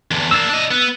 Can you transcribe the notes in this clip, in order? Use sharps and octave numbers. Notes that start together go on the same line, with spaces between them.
E2 D3
A#3 D4 E6
D4 D#5
B3